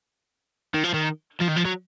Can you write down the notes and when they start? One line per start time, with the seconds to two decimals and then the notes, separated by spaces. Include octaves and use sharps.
0.74 D#3
0.83 F3
0.94 D#3
1.40 F3
1.48 D#3
1.56 F3
1.65 F#3